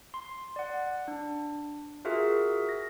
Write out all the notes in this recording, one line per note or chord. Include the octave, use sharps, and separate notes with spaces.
C6
D5 F#5
D4
F4 F#4 G#4 A#4 E5
A#6